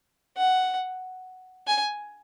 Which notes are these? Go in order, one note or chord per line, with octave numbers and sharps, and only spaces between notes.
F#5
G#5